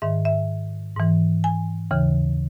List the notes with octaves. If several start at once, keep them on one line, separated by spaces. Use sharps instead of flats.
G#2 D#3 E5
E5
G#2 E3
G#5
D#2 C#3 E3